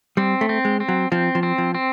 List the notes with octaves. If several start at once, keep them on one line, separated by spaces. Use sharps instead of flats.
G3 C4
A3
C4
G#3
C4
F#3
F3 C4
F3
C4
F3
C4